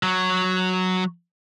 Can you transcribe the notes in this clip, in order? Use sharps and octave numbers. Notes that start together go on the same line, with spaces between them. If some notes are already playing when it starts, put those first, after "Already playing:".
F#3